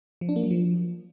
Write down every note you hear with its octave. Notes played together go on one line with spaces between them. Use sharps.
F3
D4
A#3
F#3
F3